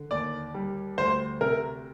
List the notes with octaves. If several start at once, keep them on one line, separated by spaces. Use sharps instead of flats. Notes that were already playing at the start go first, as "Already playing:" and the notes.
Already playing: D3
D#2 D5
G3
D2 C5
C3 A#4